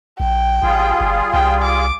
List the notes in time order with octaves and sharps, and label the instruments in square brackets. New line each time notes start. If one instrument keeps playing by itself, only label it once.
[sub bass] A#1 [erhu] G5
[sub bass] A1 [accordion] G3 F4 G#4
[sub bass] G1
[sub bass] C2 [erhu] G5
[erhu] D6